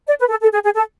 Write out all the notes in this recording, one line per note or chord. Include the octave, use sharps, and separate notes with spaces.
D5
B4
A4
A4
G#4
G#4
A4